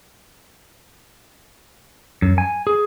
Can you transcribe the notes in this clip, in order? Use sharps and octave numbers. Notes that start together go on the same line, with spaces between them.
F#2
G#5
G#4